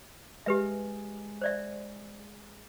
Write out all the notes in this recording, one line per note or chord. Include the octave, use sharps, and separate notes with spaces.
G#3 G4 B4 E5
C5 D5 E5